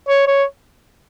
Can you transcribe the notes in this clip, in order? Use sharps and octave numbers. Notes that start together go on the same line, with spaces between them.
C#5
C#5